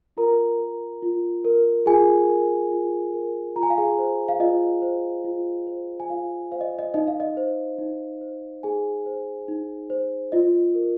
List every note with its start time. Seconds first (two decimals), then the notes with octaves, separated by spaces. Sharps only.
0.17 F4 A#4 A#5
0.60 A#4
1.02 F4
1.45 A#4
1.86 F4 G#4 G#5
2.28 A#4
2.71 F4
3.13 A#4
3.56 F4 A#5
3.63 G#5
3.70 F5
3.78 G#4 G#5
3.99 C5
4.28 F5
4.40 F4 D#5
4.82 C5
5.24 F4
5.67 C5
6.00 G#5
6.10 F4 F5
6.52 C5 F5
6.61 D#5
6.79 D#5
6.94 D#4 D#5
7.07 F5
7.20 D#5
7.37 C5
7.79 D#4
8.21 C5
8.63 D#4 G#4 G#5
9.06 C5
9.48 D#4
9.90 C5
10.32 F4 D#5
10.74 A#4